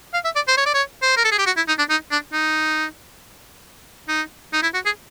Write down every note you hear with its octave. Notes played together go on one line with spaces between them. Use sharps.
F5
E5
D5
C5
C#5
D5
C#5
C5
A#4
A4
G#4
G4
F#4
E4
D#4
D4
D#4
D4
D#4
D#4
D#4
E4
F#4
G#4